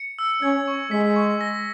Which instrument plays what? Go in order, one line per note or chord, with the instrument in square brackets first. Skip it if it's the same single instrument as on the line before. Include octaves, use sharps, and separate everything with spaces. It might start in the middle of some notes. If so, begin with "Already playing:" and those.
Already playing: [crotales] C#7
E6
[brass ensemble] C#4 [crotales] G#6
[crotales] C#6
[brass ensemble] G#3 [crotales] B6
[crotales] C#6
A#6